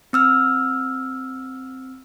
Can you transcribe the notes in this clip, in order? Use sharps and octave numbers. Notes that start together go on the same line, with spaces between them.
C4 E6 F6